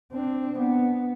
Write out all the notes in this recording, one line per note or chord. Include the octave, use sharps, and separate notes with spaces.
C4 D4
B3